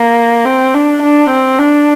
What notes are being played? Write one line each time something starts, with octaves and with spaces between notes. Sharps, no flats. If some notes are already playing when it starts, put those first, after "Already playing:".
Already playing: A#3
C4
D4
D4
C4
D4